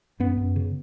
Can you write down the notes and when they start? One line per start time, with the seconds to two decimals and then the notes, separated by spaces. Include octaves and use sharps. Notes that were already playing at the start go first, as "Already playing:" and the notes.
0.20 F#2 B3
0.37 F#2
0.56 C#3